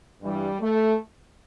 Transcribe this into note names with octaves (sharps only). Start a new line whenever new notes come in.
G2 E3 G3
A3